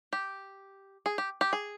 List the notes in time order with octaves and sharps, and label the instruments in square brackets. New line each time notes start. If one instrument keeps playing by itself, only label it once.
[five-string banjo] G4
G#4
G4
G4
G#4